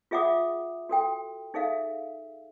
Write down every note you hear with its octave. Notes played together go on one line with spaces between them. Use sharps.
F4 G#4 E5 F#5 D6 D#6
F#4 A4 G5
D#4 G#4 A4 E5 F5